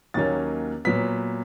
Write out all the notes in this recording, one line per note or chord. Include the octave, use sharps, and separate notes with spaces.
D#2 D#3 F#3 A#3 C#4 A6
A#2 F#3 B3 B6